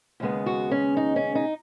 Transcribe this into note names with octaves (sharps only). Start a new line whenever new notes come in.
D#2 C#3 G#3 B3
F#4
C#4
D#4
C#4
D#4